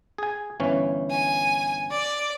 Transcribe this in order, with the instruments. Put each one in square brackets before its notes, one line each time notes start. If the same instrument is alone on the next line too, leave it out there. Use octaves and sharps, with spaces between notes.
[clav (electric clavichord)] G#4 G#5
G1 E3 C#4
[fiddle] G#5
D5